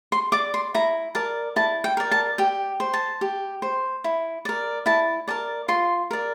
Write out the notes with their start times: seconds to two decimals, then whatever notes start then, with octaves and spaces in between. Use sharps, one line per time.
0.12 C6
0.32 D5 D6
0.54 C6
0.74 E4 A#5
1.15 A#4 D5 A5
1.56 E4 A5
1.84 G5
1.97 A#4 D5
2.11 A5
2.38 G4 G5
2.80 C5
2.93 A5
3.21 G4
3.62 C5
4.04 E4
4.45 A#4 D5
4.86 E4 A5
5.28 A#4 D5 A5
5.68 F4 C6
6.11 A#4 D5